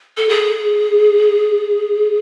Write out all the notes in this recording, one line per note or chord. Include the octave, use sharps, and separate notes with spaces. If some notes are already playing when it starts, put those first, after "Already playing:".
A4
G#4